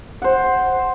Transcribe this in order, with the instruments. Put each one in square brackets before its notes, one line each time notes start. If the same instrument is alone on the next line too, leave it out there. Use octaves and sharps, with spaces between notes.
[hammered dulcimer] C5 F#5